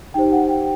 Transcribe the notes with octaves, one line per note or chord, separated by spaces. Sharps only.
D#4 G4 C5 G5
F#5
G5